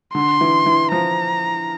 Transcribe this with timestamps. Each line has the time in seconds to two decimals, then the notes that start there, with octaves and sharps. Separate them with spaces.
0.14 D3 C6
0.41 E3
0.66 E3
0.92 F3 A#5